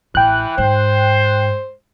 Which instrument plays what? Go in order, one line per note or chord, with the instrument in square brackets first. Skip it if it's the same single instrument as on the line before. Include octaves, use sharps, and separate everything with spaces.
[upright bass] A1 [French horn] E3 [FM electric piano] G5 F#6
[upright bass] G#2 [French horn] C5